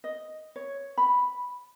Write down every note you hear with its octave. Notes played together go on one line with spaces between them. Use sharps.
D#5
C#5
B5